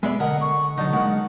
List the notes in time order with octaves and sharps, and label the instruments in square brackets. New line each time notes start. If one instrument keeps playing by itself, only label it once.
[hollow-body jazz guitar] G#3 B3 D5 [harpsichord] E5 G#5 C6
[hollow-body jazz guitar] D3 [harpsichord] A#4 D#5 G#5 [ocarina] F#5
[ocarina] C#6
[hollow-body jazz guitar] D3 F#3 [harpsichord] D#4 A5
[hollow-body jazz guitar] G#3 A#3 [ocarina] F#5